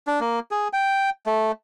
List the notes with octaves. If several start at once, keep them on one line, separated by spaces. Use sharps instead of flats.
D4
A#3
G#4
G5
A3